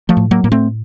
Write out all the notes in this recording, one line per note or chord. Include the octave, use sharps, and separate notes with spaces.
F3 A3
A2
F#3 A#3
A2 A#3
A3 C4